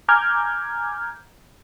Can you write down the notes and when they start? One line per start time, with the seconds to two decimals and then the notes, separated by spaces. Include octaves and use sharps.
0.08 G#5 A#5 D6 F6 G6 G#6